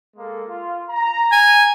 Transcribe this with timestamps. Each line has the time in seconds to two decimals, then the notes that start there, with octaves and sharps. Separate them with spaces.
0.16 G#3 A#3 A4
0.49 F4
0.90 A#5
1.32 G#5